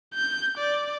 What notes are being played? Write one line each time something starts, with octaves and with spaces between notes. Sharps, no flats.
G6
D5